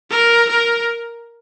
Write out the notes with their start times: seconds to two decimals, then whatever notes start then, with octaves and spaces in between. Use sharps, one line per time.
0.10 A#4
0.48 A#4